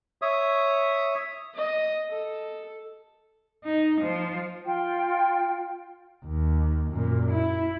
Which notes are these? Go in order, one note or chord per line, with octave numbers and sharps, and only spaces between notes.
C#5 E5 D#6
D#5
A4
D#4
F3
F4 G5
D#2
F#2 A#2
E4